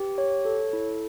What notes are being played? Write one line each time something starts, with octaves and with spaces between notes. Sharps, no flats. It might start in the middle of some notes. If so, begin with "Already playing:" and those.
Already playing: G4 B4
C#5
A4
E4